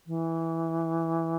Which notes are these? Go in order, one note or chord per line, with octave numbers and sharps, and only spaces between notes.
E3